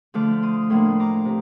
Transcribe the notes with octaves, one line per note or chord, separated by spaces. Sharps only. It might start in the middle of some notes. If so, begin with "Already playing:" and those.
D3 F3 A3 D6 F6
C6 D#6
A2 F3 A#3 D4 C6 D#6
A#5 D6
C3